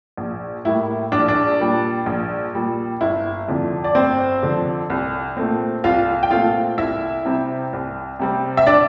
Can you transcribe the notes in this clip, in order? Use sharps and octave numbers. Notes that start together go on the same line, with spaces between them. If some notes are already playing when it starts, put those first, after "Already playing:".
A#1
A2 G3 A#3 E4
A#1 D4
D4
A#2 G3
A#1
A#2 G3
G1 E4
F2 D3 F3
D5
G1 C4 C5
F2 D3 F3
C2
A#2 A3 C4
C2 F4 F5
G5
A#2 A3 C4 F4 F5
C2 E4 E5
C3 G3 C4
C2
C3 G3 C4
E5
D4 D5